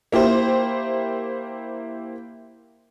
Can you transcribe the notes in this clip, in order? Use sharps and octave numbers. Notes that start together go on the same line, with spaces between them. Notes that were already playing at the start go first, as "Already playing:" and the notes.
A#3 E4 G4 C5